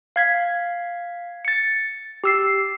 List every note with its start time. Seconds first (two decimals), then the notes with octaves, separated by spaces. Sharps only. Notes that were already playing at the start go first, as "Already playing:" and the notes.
0.16 F5 G#6 B6
1.45 A6 C#7
2.24 G4 E6 C7